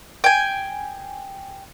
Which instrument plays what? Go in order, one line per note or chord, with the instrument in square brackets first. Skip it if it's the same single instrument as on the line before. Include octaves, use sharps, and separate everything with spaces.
[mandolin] G5 G#5